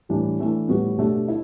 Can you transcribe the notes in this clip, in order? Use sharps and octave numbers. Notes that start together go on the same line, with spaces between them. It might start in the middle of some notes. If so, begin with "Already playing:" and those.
A2 E3 G3 D4
E3 A3 D4
A2 G3 B3 F#4
B2 A3 D4 G4
E4